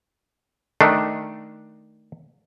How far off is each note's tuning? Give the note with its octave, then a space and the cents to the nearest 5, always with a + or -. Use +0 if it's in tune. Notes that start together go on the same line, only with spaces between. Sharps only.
D#3 +0 A3 -5 D4 +0